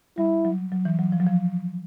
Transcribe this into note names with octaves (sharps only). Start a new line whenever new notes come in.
G3 E4
F#3
F#3
E3
F#3
F3
F#3
F3